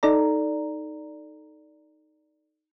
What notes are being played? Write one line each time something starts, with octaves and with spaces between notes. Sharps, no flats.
D#4 A4 D5 A#5